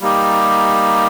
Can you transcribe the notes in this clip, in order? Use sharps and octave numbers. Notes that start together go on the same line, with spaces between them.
G3 A#3 D#4 G4